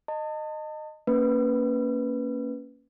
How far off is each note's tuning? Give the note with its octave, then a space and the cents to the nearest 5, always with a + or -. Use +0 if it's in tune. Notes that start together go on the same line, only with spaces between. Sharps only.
D#5 -15 A5 +35
A#3 -10 C#4 +0 B4 +0